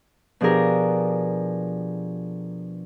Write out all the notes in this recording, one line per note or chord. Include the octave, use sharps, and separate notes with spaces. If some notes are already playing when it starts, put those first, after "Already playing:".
B2 F3 D4 G4 G#4 A#4